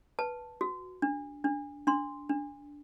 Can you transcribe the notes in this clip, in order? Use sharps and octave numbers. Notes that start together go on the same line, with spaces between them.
B4 A5
F#4
D4
D4
D4 C6
D4